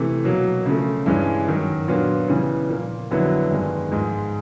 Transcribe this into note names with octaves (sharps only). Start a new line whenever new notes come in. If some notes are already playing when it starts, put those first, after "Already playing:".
Already playing: C3 E3 A3
B2 F#3 A#3
C#3 F3 A3
G2 E3 G#3 C#4
F#2 D#3 F#3
A#2 F#3 B3 D4 F4
C#3 E3 G3 B3
A#2 F3 A#3
F2 D3 F#3 B3 E4
G2 D#3 G#3 B3
G#2 F3 G#3